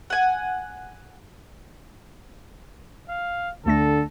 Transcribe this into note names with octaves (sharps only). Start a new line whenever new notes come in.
F#5 G#5
F5
D2 D3 A3 A4 A#6